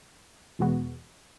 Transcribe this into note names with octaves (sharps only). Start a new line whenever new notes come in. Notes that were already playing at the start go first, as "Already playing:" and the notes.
E2 B2 G#3 B3 F#4